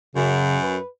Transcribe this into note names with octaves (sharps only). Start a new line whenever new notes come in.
F#2 C#3
B4